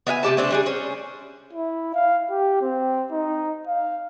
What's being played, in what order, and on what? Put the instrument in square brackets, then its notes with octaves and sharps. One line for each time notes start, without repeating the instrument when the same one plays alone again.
[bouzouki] B3 E5 F5 G#5
C3 A3 G4 A5
A3 C4 D4
G3 D4 G#4
C#4 G#4 C5
[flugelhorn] E4
F5
G4
C4
D#4
F5